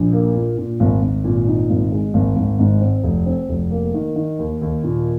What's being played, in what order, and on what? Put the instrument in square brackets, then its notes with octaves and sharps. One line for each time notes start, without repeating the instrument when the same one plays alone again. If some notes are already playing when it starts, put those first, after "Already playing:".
Already playing: [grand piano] A#1
A#3
A#2
A#2
G#1
G#1
A#2
D#4
G#1
G#3
G#1
G#1
G#2
C4
F1
C4
F1
A#3
D#3
D#3
D#2
D#2
A#2